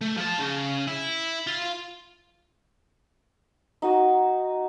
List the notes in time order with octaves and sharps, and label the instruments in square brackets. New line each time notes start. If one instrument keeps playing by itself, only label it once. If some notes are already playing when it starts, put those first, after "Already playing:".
[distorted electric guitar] A3
F3 A5
C#3
E4
F4
[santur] D#4 F#4 D#5